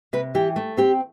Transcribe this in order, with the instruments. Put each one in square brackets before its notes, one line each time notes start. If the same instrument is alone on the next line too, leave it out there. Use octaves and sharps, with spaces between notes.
[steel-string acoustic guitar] C3 B4
E3 G4
A3
C4 G4